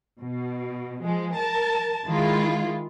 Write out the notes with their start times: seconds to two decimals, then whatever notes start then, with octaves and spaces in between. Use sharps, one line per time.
0.20 B2
1.04 F3 G#3
1.34 A#4 A5
2.07 D#3 G#3 E4 F4